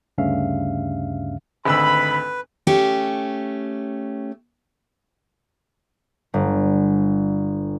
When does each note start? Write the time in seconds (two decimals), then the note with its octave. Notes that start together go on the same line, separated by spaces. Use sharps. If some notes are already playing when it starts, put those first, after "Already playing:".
0.18 D2 G2 C#3 C#4 E5 F5
1.65 G#1 D2 B4 B5 E6
2.67 A3 C#4 G4
6.34 G1